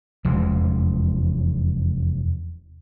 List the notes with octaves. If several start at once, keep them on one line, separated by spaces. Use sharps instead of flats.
F1 E2 C#3 G#3